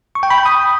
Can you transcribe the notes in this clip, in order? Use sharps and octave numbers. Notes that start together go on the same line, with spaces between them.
C#6
G5
B5
G6
D#6